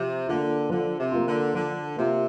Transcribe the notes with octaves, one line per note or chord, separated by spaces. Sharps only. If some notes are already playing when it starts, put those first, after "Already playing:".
Already playing: C3 F3
D3 A#3 F4
D3 F3
C3
A#3 F4
D3
D3 F3
C3 A#3 F4